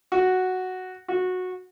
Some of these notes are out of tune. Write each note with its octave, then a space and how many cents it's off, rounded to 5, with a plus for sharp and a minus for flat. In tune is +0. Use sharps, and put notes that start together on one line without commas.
F#4 +0
F#4 -15